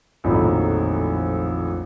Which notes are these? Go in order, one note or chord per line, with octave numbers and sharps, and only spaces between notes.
A#1 F2 A2 D#3 F#3 B5